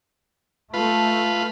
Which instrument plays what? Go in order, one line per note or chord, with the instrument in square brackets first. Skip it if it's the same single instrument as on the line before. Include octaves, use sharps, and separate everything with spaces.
[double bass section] A3 [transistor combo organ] F4 B4